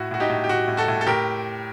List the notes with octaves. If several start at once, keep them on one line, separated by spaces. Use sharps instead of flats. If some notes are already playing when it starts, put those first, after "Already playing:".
Already playing: A2 F#4
A2 F#4
D#4 G4
A2
G4
A2 F#4
A2
F#4 A4
A2
A4
A2 G4 A#4